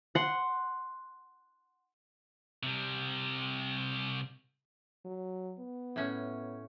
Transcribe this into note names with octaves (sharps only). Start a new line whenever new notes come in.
F#5 C6
C3 G3
F#3
B3
A2 C#4